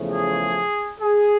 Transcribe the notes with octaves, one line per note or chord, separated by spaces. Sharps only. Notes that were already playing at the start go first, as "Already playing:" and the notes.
Already playing: E2 C#3 F3 A3
G#4
G#4